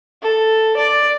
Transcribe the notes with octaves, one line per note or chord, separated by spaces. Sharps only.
A4
D5